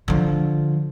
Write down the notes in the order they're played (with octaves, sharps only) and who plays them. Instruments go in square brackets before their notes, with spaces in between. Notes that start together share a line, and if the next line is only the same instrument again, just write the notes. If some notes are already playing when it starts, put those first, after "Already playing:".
[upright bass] D3 F3